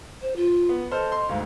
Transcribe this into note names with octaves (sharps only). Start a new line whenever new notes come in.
C5
F4
B3
A4 C5 D#5 F6
C6
D2 G#2 F5